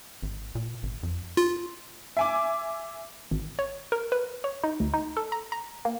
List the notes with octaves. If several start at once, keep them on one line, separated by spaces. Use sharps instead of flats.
G#1
A#2
G#1
F2
F4
E5 G#5 D6
G#1
C#5
A#4
B4
C#5
D#4
D2
D#4
A4
A#5
A#5
A#3